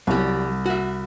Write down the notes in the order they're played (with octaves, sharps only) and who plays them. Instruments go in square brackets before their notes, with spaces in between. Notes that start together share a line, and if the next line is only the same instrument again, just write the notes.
[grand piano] C2 [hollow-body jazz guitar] F#3 G3
[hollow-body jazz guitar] F#4 E5